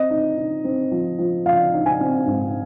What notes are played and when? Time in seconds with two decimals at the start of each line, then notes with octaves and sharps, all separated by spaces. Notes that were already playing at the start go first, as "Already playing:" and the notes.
Already playing: C4 D#5
0.10 D#4
0.37 D#4
0.64 C4
0.91 F3
1.18 F3
1.46 F3 F5
1.73 D#4
1.86 G#5
2.00 C4
2.27 G#2